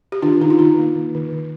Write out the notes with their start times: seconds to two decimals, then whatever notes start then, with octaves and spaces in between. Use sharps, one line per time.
0.12 G4
0.22 D#3 D4 F4
0.41 D#3 D#4
0.50 F4
0.59 D#3 D#4
0.78 A#3
0.96 D#3
1.15 D#3
1.32 D#3